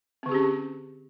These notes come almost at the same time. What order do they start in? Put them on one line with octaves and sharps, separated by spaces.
C4 D3 G#4 G4 C#4